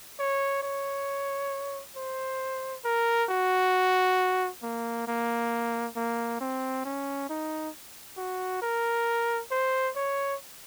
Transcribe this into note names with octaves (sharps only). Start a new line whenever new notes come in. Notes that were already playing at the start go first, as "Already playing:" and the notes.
C#5
C#5
C5
A#4
F#4
A#3
A#3
A#3
C4
C#4
D#4
F#4
A#4
C5
C#5